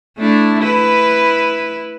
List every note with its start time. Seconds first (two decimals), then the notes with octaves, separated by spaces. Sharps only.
0.18 A3 D4 E4
0.61 E4 B4